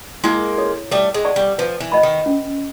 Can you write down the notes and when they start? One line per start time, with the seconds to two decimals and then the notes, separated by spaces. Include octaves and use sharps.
0.24 G#3 A#3 E4
0.58 A4 C#5
0.91 G3 A3 A4
1.14 G#3
1.25 D5 F#5 A5 C#6
1.36 G3
1.58 F3 B4
1.80 E3
1.92 D#5 F#5 B5
2.03 D#3
2.26 C#4